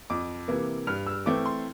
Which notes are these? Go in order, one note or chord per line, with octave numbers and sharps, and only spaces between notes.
F2 D6
C3 E3 A#3
G2 F6
E6
E3 A3 C4 D6
C6